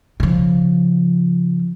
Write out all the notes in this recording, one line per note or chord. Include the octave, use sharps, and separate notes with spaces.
C#3 F3